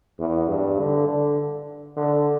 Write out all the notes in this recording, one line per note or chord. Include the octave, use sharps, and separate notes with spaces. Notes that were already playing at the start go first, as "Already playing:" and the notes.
E2
G2
D3
D3
D3